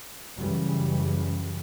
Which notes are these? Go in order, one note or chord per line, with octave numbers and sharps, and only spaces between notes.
F#2 C#3 E3 G3